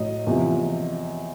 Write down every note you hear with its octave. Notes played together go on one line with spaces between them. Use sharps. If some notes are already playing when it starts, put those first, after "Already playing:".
Already playing: A2 F#3 D#5
E2 C3 F3